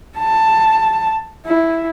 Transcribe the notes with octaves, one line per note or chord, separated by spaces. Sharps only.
A5
E4